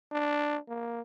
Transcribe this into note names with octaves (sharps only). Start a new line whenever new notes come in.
D4
A#3